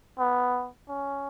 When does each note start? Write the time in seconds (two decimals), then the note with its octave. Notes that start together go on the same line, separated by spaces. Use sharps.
0.19 B3
0.89 C#4